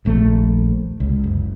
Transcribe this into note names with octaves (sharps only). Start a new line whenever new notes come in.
D#1 A#1 A3
C#2
F#1